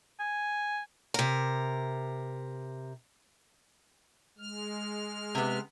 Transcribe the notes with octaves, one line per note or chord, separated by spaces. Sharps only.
G#5
C3 A#4
G#3 F6
C3 B3